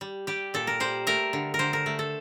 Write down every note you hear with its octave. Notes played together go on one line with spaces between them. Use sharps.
G3
G3 G4
A#2 A4
A#4
G3 C5
A3 A#4
D3
A#4
D3 C5
A#4
A3
A4